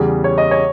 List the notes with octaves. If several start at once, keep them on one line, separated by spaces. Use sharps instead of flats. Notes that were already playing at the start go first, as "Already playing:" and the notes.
Already playing: E2 C#3 G3
C#5
D#5
C#5